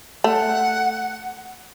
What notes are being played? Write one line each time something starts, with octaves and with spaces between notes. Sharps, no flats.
A3 F#5